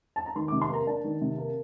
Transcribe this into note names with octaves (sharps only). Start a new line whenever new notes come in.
A5
A#5
D#3 C6
C3 D6
C6
A#3 A#5
D4 A5
D#3
C3
A#3